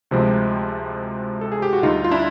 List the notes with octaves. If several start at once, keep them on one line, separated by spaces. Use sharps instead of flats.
D2 C3 F3 G#3 C4
A4
G#4
G4
F#4
D2 D3 G3 D#4 F4
F4
D4 E4